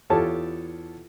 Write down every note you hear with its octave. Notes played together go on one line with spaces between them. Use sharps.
E2 F4 G4 A4 C#5 A5